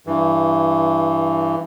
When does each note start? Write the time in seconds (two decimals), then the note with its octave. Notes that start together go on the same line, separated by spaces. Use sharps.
0.07 G2 E3